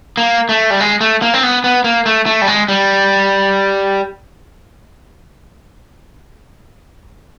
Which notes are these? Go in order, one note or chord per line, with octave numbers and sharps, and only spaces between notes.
A#3
A3
G3
G#3
A3
A#3
C4
B3
B3
A#3
A3
A3
G3
G#3
G3